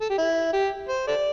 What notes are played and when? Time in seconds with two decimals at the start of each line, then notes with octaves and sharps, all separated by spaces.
0.01 A4
0.10 G4
0.18 E4
0.53 G4
0.89 C5
1.07 A4 D5